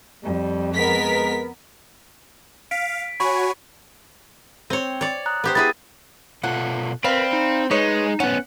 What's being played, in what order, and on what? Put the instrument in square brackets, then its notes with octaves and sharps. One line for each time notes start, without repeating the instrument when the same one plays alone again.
[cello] F2 [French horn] G3
[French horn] G#3 [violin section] B3 A#4 B6
[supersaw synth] F5 [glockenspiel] B6 D7
[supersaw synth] F#4 C#5 G#5 [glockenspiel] B5 C#6
[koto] C4 C#5
C#5 D5
[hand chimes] A#5 D#6 F#6
[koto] B3 G4 C5
[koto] B3 E4 G#4 [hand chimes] A6
[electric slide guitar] B2 F4 A4 [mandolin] F#5
[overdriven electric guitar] C4 [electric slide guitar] A#4 B4 [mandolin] D5 F5 B5
[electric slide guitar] D#4
[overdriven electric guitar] G#3 [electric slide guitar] D#4 [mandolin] B4 C#5 D#5
[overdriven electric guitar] B3 C#4 [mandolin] F#5